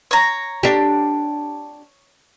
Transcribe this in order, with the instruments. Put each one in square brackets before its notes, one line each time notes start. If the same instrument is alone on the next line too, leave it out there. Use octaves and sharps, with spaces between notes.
[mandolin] C#5 A#5
[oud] D4 G4